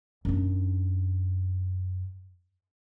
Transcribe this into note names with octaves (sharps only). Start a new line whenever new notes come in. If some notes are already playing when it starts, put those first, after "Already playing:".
F#2 D4